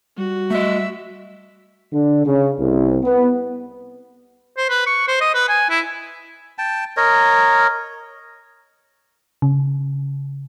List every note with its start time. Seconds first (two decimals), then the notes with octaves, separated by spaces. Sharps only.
0.17 G3 F#4
0.50 A3 D#5 E5
1.93 D3
2.26 C#3
2.59 C2
3.04 B3
4.57 C5
4.70 B4
4.86 C#6
5.08 C5
5.21 D#5
5.34 B4
5.49 G#5
5.70 E4
6.58 G5 A5
6.97 A#4 C#5 D#5
9.42 C#3